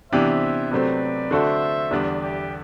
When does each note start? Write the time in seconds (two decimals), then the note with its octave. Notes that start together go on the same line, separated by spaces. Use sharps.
0.11 C3 E3 B3 D4 G4 C5 E5
0.71 C3 F#3 A3 C4 B4 D5
1.31 D3 A3 D4 F#4 A4 C5 E5
1.91 E2 D3 G3 B3 D4
2.20 E4 G4